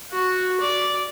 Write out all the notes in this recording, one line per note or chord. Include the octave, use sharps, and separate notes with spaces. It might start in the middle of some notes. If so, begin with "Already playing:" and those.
F#4
D5